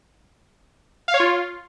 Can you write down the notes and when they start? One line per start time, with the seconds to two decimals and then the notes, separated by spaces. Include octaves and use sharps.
1.08 F5
1.14 C#5
1.20 F4